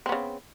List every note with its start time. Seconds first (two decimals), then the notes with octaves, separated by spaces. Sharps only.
0.06 C4
0.09 B3
0.12 C#3